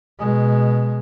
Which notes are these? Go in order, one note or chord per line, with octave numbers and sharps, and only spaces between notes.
B2 G#3